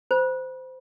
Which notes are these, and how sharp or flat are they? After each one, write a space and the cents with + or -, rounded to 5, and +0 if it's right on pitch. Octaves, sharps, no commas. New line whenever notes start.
C5 -20 B5 -35